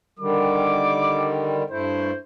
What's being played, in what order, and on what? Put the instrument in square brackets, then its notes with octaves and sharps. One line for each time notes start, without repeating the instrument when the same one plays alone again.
[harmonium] D3 D#3 G3 [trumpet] D6
[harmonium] G2 A3 E4 [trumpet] C5